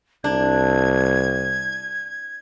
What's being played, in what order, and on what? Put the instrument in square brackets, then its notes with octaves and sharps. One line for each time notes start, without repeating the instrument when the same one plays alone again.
[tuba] C2 [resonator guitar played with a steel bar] D4 [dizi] G#6